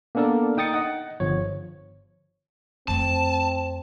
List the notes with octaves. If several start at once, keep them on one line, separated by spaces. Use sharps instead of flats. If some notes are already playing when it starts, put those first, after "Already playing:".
A#3 B3 D4 A4 A#4 D5
D#4 G5 D#6 A6 C#7
D#5 F#5
G1 F3 C#5
F2 A3 C4 A5